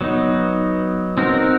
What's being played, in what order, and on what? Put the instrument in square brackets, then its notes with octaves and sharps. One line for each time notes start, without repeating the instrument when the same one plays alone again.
[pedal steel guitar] F#3 B3 D#4
C4 D#4 F#4 A#4